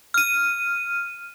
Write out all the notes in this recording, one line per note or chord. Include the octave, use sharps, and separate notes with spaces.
F6 D#7